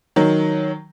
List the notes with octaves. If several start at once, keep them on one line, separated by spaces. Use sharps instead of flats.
D#3 F#3